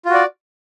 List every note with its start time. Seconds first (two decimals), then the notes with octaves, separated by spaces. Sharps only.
0.05 F4
0.09 F#4
0.14 D5